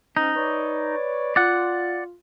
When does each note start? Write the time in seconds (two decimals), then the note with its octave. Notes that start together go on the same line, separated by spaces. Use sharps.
0.17 G#2 C#4 D#4
0.36 B4 C#5 D5
1.36 F4 D5 F#5